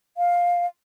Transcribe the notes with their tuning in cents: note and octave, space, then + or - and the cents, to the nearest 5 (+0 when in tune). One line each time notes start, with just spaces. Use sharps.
F5 +10